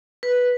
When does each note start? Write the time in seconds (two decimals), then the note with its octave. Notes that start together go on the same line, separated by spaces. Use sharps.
0.23 B4